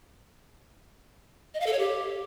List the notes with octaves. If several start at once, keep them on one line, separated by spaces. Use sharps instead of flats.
D#5
F5
A4
C#5
G4